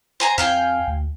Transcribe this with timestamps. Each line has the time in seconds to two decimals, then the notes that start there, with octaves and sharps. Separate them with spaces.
0.20 C5 G#5 A#5
0.38 F2 F5 G5 G#5
0.88 D2